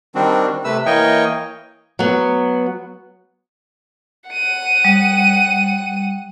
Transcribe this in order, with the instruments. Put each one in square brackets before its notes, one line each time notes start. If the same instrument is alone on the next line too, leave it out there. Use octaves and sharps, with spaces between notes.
[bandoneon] D#3 G3 C4 D4 F#4
C3 A3 B4 E6
E3 A#3 C#5 D#5 G5 C#6
[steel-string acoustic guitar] F#3 B3
[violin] F#5 D#7
[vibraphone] G3